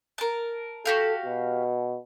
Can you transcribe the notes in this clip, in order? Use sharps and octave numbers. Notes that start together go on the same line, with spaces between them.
A#4 A5
F#4 G4 A4 F5
B2